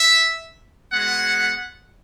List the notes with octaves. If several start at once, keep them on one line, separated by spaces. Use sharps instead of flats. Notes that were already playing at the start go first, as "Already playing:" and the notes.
Already playing: E5
G#3 B3 F#4 F#5